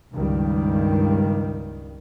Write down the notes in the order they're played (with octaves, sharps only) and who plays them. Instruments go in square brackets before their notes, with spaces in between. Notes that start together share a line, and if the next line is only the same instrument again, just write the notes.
[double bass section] C#2 G2 D#3 G3